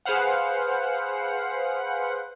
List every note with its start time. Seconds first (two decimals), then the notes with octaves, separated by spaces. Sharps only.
0.05 G#4 B4 C5 F5 F#5